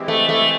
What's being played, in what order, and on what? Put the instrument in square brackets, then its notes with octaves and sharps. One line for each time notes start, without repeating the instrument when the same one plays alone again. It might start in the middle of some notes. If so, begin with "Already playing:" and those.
Already playing: [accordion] E3 G#3 C4 E4 G4
[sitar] A3
A3